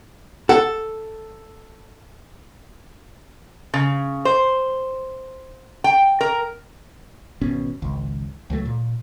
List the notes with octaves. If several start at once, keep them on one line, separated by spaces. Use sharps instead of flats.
A4 F#5
C#3
C5
G5
A#4
G#1 B2 C#4
G#1 C#2
C#2 F#3 A3
A#2